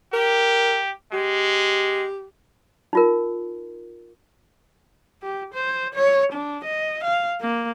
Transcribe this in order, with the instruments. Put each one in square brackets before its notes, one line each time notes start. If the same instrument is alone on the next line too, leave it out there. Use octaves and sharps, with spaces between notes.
[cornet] G4 [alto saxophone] A#4
[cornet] G#3 [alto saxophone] G4
[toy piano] D#4 F4 A#4
[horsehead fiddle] G4
C5
C#5
D4
D#5
F5
A#3